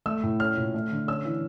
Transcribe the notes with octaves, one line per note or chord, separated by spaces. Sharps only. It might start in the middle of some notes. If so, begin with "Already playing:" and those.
A3 E6
A2
C#4 F6
A#2
A3
D3
C#4 E6
E3